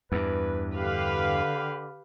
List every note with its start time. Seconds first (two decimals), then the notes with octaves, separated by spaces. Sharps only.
0.12 E2 G2 B4
0.76 D3 G4 B4 F5